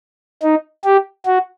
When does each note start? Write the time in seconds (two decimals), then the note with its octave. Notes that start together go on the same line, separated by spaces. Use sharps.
0.43 D#4
0.84 G4
1.26 F#4